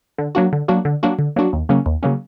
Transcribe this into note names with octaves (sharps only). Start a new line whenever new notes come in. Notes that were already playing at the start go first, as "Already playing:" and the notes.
D3
F#3 A#3 D4 F#4
D3
F#3 A#3 D4 F#4
D3
F#3 A#3 D4 F#4
D3
F#3 A#3 D4 F#4
D#2
C#3 F#3 A#3 C#4
D#2
C#3 F#3 A#3 C#4